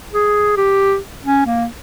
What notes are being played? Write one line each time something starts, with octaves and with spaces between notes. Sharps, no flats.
G#4
G4
C#4
A#3